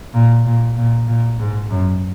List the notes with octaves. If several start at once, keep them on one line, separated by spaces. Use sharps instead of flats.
A#2
A#2
A#2
A#2
G#2
F#2